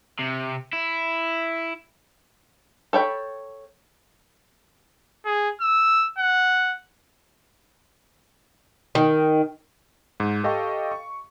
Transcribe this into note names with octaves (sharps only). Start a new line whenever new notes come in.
C3
E4
A4 C#5 G5 B5
G#4
E6
F#5
D#3
G#2 D#7
G4 A4 D#5 F5 G5 C#6
C#6